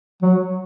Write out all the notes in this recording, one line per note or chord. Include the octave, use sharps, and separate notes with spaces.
F#3